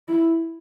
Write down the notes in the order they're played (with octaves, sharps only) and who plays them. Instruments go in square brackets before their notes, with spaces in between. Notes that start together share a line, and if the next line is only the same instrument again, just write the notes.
[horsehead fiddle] E4